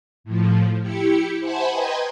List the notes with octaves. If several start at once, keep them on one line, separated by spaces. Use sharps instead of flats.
A2 F3
E4 G4 C#7
C5 E5 F#5 G#5 A5 B5
B4 D#5 G5 A#5 C6 G#6